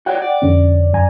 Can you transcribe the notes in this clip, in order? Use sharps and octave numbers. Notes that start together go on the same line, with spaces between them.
F#4 C#5 D5 F#5 G5
D5
F2 D3 C#4
F#2 G#5 A#5